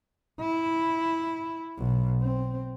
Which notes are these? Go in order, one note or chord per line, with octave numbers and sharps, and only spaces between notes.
E4
B1
C4